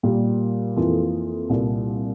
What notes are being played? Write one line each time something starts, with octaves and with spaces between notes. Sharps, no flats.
A#2 G3 A#3
F2 E3 A#3 F4 A4
C2 A#2 G3